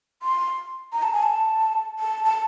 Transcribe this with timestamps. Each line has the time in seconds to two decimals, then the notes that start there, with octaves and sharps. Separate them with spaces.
0.23 C6
0.93 A#5
1.03 A5
1.13 G#5
1.23 A5
1.99 A5
2.24 A5